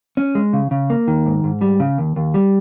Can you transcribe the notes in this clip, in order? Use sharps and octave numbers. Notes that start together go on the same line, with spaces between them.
C#4
G#3
C#3
C#3
A#3
D#3
G#2
G#2
G3
C#3
D#2
D#2
G3